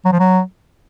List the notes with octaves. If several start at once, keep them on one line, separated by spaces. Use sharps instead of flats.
F#3
F3
F#3